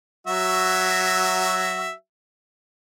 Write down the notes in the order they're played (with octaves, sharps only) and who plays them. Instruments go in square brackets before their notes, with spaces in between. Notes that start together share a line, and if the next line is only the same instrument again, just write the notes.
[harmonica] F#3 F#4 E5